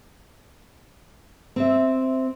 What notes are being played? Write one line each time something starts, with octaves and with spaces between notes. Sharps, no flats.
C4 E5